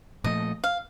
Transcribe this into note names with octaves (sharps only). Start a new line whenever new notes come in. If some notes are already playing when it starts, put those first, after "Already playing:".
A#2 F3 A3 D#5
F5